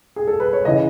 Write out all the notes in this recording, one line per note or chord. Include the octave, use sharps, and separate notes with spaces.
G#4
A4
B4
C#5
C#3 E3 D#5